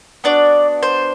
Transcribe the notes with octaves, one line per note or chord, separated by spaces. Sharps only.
B3 D4 F#4 D5
C5